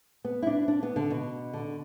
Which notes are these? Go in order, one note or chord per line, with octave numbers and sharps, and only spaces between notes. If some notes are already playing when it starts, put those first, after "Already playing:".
B3
E4
D4
D4
B3
D3
B2
D3